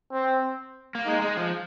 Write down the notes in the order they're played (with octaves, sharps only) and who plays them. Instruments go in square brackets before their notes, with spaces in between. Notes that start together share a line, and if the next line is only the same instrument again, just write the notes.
[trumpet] C4
[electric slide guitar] A#3
[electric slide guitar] G#3 [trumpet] D#4
[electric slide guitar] G#3
F3